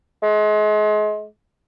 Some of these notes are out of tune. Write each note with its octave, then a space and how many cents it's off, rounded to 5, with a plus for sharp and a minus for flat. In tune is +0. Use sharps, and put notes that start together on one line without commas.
G#3 +35